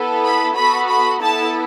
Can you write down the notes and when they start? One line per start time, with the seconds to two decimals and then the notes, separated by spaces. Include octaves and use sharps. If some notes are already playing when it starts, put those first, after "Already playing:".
Already playing: B3 E4 A4
0.24 B5
0.56 B3 F#4 A4 B5
0.89 B5
1.22 B3 E4 A4 A5